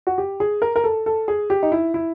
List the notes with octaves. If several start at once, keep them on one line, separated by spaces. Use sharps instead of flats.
F#4
G4
G#4
A#4
A#4
A4
A4
G#4
G4
D#4
E4
E4